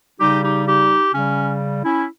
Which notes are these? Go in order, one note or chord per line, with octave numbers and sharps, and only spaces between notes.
C#3 G3 D#4 G4
D#4 G4
D#4 G4
C#3 G3 C#4
C#4 E4